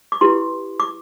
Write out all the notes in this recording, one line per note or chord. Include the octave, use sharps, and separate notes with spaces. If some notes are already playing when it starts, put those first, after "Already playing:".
D6
E4 G4 B4 C6
D6